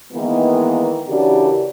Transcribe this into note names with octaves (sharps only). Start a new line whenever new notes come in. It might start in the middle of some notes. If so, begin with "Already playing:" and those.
D#3 E3 G#3 A#3 B3
C#3 E3 D4 F#4 G4 A#4